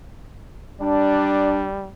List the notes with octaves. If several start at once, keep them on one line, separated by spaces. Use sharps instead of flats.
G3 D4